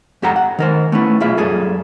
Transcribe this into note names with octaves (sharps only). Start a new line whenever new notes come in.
F2 G#2 G4 A4 F#5 A#5
F#5
D#3 A#4 C5
A3 B3 C#4 E4
B1 A#2 F4 G#4 E5
F#2 G3 G#4 A4